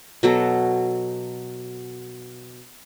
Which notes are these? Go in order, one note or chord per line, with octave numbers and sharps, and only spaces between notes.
B2 F#3 A4